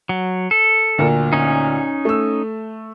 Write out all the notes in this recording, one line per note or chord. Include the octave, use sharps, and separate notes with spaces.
F#3
A4
D2 A#2 A#4
C#4 D#4
A3 E6